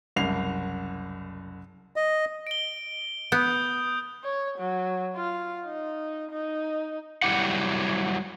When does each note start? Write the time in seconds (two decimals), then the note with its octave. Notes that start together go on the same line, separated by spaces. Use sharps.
0.16 F#1 C2 C7 F7
1.96 D#5
2.47 D7 G7
3.32 B3 D#6 G6
4.24 C#5
4.58 F#3
5.16 F4
5.65 D#4
6.31 D#4
7.22 F#3 G3 E4 G4 F#5